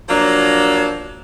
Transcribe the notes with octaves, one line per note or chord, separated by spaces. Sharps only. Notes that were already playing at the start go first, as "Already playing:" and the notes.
F3 F#3 A#3 D4